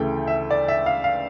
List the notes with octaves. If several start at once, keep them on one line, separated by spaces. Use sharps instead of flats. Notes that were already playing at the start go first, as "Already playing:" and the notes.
Already playing: D2 C#3 E3 A3 G5
E5
D5
E5
F5
F5